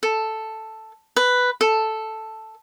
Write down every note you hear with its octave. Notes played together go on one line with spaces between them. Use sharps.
A4
B4
A4